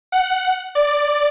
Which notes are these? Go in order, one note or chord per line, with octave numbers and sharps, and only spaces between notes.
F#5
D5